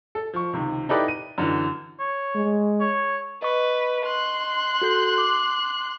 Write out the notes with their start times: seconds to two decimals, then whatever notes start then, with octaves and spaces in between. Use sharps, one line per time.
0.15 A4
0.34 F3 C#6
0.53 C#2 C3 D#3
0.89 D#4 E4 G4 A4 B4 D5
1.08 D#7
1.38 F#2 D3 E3
1.99 C#5
2.35 G#3
2.80 C#5
3.42 B4 D#5 C#6
4.06 C6 F#6
4.82 F#4 A4 G6
5.18 D6